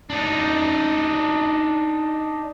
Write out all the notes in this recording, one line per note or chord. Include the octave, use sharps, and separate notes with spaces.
D4 D#4